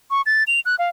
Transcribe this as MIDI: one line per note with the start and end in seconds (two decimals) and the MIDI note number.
0.11 0.22 85
0.26 0.44 93
0.47 0.60 101
0.66 0.76 90
0.79 0.89 77